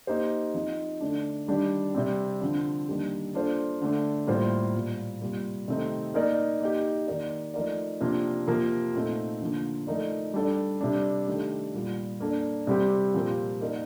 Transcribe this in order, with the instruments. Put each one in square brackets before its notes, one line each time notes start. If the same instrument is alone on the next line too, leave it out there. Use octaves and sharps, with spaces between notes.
[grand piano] A#3 D#4 G4 C5
F3 C4 D#4
D3 A3 D4
D#3 G3 D4 G4
C3 G3 C4
D3 F3 C4
D#3 G3 A#3 D4 G4
A#3 D4 F4 A4 C5
D3 A3 D4
A2 G3 A#3 F4 C5
A#2 G3 A#3
C3 G3 A#3 F4
C3 D#3 A3 C4 D#4
A#3 D#4 A#4 D5
A#3 D#4 G4
D#3 A#3 D#4 A#4 D5
F3 A3 D#4 A#4 D5
C3 F3 A#3 D4 F4
C3 F3 A#3 F4 A#4
A#2 A3 C4 D#4
D3 F3 A#3
F3 A3 D#4 A#4 D5
G3 D4 A4 D5
C3 G3 D4
D#3 A3 D4 G4
A#2 G3 A#3 F4
A#3 D4 A4 D5
C3 G3 C4 G4
A#2 F3 C4 G4 A#4
A#3 D#4 A#4 D5